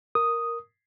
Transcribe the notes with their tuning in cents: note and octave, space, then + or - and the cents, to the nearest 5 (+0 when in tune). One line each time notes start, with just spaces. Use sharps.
A#4 +0 D#6 +0